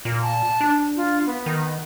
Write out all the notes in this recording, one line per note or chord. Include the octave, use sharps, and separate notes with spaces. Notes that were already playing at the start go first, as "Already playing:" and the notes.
A#2
A5
D4
F4
B3
D#3